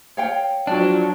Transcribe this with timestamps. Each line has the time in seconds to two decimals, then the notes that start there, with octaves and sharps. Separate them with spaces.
0.17 C#5 F5 G5
0.67 F3 F#3 D4